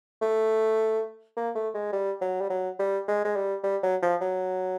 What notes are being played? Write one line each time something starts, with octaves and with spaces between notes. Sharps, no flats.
A3
A#3
A3
G#3
G3
F#3
G3
F#3
G3
G#3
G#3
G3
G3
F#3
F3
F#3